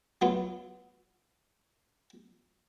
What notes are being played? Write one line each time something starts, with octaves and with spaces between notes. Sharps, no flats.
F#3 B3 E4 F4